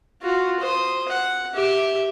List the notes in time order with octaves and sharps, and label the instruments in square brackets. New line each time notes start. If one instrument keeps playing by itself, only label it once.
[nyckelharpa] F4 F#4
C5 D#6
F#5
G4 E5